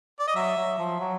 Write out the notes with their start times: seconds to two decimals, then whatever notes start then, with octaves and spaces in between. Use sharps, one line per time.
0.19 D5
0.27 D#5
0.35 F#3 E5
0.57 F#3
0.78 F3
1.00 F#3